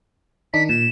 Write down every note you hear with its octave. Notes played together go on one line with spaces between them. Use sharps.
D#3 D4 D#4 B6
A#2 E7